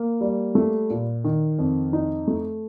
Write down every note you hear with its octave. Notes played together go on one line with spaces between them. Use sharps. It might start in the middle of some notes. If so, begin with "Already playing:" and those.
Already playing: A#3
G3
A3
A#2
D#3
F2
D#4
A3